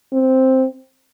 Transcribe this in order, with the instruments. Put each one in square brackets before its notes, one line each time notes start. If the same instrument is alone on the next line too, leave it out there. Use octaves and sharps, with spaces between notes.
[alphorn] C4